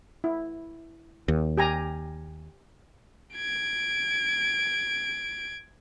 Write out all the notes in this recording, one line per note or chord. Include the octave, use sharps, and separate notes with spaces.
E4
D#2
G4 G#5 A#5
G#6 D7